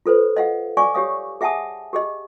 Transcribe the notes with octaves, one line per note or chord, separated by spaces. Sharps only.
F4 A4 B4 C5
D#5 F5 F#5
D5 F5 G#5 C#6 D6
G4 C#5 F5 D#6
G#4 E5 F#5 G#5 A5 D#6
G4 G#4 D#5